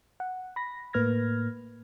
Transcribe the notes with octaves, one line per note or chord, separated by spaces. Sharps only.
F#5
B5 A#6
A2 A#3 B4 F6 G#6 A#6